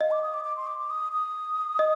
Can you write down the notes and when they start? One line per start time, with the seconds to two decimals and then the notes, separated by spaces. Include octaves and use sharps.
0.01 D#5 F5
0.11 D6
0.23 D#6
0.34 D6
0.44 D6
0.57 C6
0.67 D6
0.79 D6
0.90 D#6
1.12 D#6
1.79 D#5